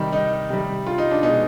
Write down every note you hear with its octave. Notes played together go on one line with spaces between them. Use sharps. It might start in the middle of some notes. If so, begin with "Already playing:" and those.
Already playing: C3 D#3 G3
D#4
C3 G3
F4
D#4
D4
B2 D#4
G#3